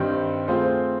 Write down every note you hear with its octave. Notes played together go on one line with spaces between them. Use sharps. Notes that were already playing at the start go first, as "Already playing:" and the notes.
Already playing: G2 D#3 G3 C4
A3 C4 F4 G#4 C5